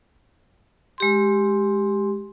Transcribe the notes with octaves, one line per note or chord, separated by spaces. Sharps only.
G#3 G4 C6